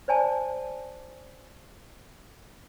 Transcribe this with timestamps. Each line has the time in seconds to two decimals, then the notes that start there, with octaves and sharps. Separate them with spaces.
0.08 C5 D5 G#5 A5